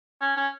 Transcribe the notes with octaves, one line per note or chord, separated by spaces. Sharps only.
C#4
C#4